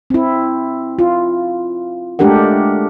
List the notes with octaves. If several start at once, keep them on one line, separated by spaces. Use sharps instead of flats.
C4 E4
F4
G#3 A3 D4 G4 A#4 F#5